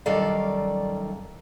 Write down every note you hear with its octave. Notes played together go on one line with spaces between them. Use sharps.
F#2 D#3 G3 A4 D5 F5